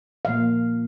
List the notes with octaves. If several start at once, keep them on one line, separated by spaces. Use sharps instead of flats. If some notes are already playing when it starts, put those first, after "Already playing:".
A#2 F3 A#3 F5